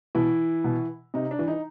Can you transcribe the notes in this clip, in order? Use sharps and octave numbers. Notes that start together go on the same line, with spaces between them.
B2 E3 E4
B2
C3 D#4
D4
E3
D#4